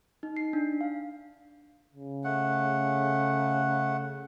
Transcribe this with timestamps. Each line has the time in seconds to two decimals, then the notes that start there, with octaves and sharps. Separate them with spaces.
0.23 D#4
0.37 C7
0.53 D4
0.81 F5
1.93 C#3
2.24 A3 F#5